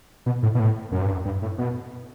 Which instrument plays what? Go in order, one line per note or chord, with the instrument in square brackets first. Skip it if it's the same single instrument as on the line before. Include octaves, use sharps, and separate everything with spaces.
[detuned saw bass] B2
A2
B2
A2
F#2
G2
F#2
G2
A2
B2